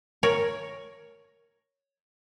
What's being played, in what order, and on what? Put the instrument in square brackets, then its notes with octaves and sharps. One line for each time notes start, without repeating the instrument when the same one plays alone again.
[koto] A#4 C#5